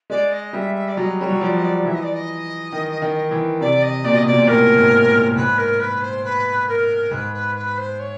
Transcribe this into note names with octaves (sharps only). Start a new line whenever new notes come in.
G#3 D5
D#5
G3 E5
E5
D5
F#3 D#5
G3 C#5
F#3
F3 D5
D#5
D5
E3 E5
D#5
D5
D#5
D#3
D#3
E3
C3 D5
D#5
A#2 D5
B2
A#2 D#5
B2 D5
A#2
A2 A#4
G#2
A#2
G#2 B4
A#4
B4
C5
B4
A#4
G#2 B4
B4
B4
C5
C#5